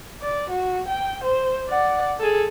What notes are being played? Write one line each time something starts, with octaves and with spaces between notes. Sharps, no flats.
D5
F#4
G5
C5
D5 F#5
G#4 A4